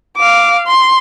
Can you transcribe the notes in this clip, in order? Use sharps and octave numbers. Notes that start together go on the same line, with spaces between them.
F5 D6
C6